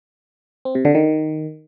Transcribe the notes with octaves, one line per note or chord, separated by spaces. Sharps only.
C4
C3
D3
D#3